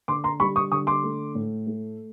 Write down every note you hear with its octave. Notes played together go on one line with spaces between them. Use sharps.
D3 C6 D6
A#5 C6
G3 B5 C#6
C#6 D#6
D3 C#6 D#6
C6 D6
A3
A2
A3